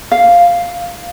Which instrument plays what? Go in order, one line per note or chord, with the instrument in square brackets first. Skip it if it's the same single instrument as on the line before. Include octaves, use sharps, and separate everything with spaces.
[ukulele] F5